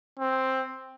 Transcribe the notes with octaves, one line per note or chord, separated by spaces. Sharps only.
C4